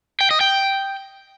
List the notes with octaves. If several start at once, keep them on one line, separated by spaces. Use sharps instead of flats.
G5
D#5
G5